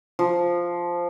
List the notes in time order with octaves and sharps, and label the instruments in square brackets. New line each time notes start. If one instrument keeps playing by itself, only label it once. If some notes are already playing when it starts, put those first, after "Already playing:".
[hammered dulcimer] F3